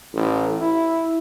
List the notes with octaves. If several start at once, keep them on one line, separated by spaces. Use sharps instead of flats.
A1
E4